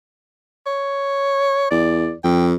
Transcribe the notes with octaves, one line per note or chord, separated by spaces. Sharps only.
C#5
E2 D5
F2 G5